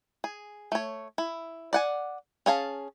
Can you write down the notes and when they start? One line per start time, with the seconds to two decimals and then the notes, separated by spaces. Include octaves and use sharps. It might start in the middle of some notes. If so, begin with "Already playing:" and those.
0.24 G#4
0.72 A3 C#5
1.18 E4
1.73 D5 F#5 G#5
2.46 C#4 G#4 F5 A5